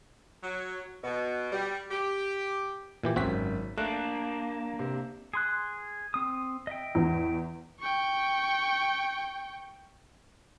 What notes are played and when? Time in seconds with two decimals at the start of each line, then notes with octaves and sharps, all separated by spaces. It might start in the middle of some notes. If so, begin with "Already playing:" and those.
0.43 F#3
1.04 B2
1.53 G3
1.91 G4
3.03 A#2 E3 G4
3.16 G#1 F#2 C4 F#4 B6
3.78 A3 A#3 D4 F#6
4.79 C3
5.34 G#4 C6 F#6
6.14 C4 D#6
6.67 D#5 E5 G5
6.95 E2
7.80 G5 C#6